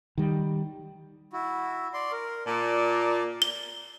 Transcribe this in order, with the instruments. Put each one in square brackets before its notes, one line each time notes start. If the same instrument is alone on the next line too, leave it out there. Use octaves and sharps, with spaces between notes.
[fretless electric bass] D#3 G3
[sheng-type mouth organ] E4 F#4
D5 C6
A#4
[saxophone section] A#2 [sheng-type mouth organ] D5 A5
[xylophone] G7